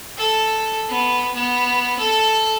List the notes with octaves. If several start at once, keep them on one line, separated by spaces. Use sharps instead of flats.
A4
B3
B3
A4